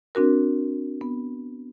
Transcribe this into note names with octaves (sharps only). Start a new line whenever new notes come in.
C4 D4 F#4 A#4
B3